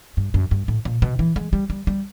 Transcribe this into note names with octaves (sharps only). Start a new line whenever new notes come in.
G2
F#2
G2
A2
A#2
B2
E3
G#3
G3
G3
G3